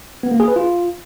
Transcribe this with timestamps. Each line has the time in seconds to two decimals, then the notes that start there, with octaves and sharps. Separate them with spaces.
0.23 B3
0.32 A#3
0.40 G#4
0.48 B4
0.56 F4